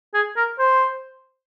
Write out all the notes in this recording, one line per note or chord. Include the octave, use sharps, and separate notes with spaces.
G#4
A#4
C5